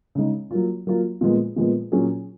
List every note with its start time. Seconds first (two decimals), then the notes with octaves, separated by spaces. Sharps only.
0.15 C#3 G#3 D#4
0.51 F#3 A#3 F4
0.87 F#3 A#3 F4
1.21 A#2 F3 G#3 B3
1.56 A#2 F3 G#3 B3
1.92 A#2 F#3 C#4 G#4